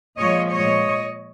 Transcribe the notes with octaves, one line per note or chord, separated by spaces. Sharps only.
A#2 F3 G#3 C#5 D#5
C#5 D#5